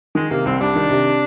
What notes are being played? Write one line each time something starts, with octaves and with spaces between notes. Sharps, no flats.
D#3 G#3
C3 A#3
C2 C4
G3 D4
D#3
C3